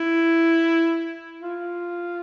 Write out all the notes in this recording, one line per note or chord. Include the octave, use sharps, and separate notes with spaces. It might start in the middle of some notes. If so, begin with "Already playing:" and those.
Already playing: E4
F4